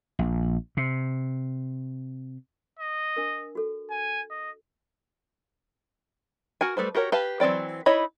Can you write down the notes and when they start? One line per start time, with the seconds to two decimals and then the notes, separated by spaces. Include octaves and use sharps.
0.19 A#1
0.77 C3
2.79 D#5
3.17 D4 A#4
3.55 F#4 A4
3.91 G#5
4.31 D#5
6.61 F#4 A#4 G#5
6.77 G3 A3 B4 C5
6.95 F#4 G4 A#4 C#5
7.12 G4 B4 F5 A5
7.40 E3 F#3 C4 D5 G5
7.86 D#4 E4 C#5 D#5 B5